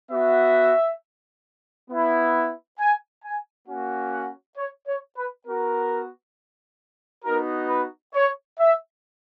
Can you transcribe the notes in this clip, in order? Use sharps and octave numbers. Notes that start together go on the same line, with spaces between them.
B3 F#4 E5
B3 E4
G#5
G#5
A#3 C#4 F#4
F#5
C#5
C#5
B4
B3 F#4 A#4
B3 D#4 F#4 A#4
B4
C#5
E5